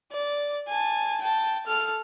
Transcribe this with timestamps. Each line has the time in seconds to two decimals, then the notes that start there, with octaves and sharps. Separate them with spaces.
0.12 D5
0.68 G#5 A5
1.22 G5 A5
1.66 A4 F6